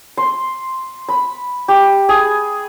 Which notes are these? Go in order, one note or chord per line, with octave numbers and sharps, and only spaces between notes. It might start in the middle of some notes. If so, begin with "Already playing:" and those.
C6
B5
G4
G#4